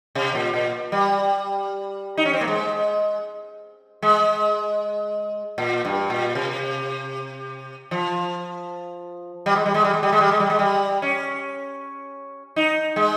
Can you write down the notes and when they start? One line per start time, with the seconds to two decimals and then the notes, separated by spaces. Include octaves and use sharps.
0.15 C3
0.35 A#2
0.54 A#2
0.92 G3
2.17 D#4
2.25 C#4
2.33 C4
2.41 A#3
2.48 G#3
4.02 G#3
5.58 A#2
5.85 G2
6.10 A#2
6.35 C3
7.91 F3
9.46 G3
9.56 G#3
9.66 G3
9.74 G#3
9.84 G3
9.94 G#3
10.03 G3
10.12 G#3
10.21 G3
10.31 G#3
10.40 G3
10.50 G#3
10.59 G3
11.02 C#4
12.56 D#4
12.96 G#3